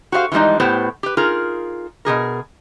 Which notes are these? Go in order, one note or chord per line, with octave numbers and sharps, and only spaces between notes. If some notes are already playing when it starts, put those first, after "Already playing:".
F#4 G4 C5 D5 F5
E3 F3 G3 G#3 D#4
A2 B3 G4 B4 C5
G4 B4
D#4 F4 G#4 A#4
B2 D#3 G#4 A#4